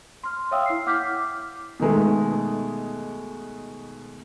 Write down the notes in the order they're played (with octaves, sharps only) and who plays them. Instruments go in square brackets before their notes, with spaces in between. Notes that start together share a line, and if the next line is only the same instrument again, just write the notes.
[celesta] C6 F6
C#5 E5 F5 G5 D#6 E6
E4 C7
F#5 D6 F6 G6 B6
[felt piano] B2 D#3 G#3 A3